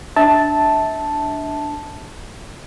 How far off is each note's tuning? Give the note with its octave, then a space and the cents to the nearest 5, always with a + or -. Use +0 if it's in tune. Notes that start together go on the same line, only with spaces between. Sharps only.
D4 +0 E5 -30 A5 +0